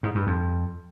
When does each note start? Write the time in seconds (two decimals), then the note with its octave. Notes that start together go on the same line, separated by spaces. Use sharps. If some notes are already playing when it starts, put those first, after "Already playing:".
0.03 G#2
0.15 G2
0.27 F2